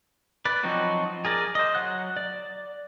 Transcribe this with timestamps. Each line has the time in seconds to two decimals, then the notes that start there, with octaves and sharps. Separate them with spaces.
0.45 B4 D5
0.63 F3 F#3 C4 D#4 F#4
1.25 G#4 A#4 D5
1.55 C5 D#5
1.75 F#3 F#5 F#6
2.17 D5